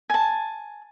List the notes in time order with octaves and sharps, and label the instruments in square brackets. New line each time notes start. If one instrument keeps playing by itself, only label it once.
[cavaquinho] G#5 A5